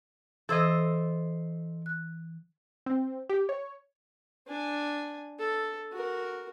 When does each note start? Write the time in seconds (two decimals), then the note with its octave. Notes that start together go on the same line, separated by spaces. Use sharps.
0.49 E3 A4 C5 D#5 E6 G#6
1.86 F#6
2.86 C4
3.29 G4
3.49 C#5
4.47 D4 G#5
5.39 A4
5.92 F#4 A#4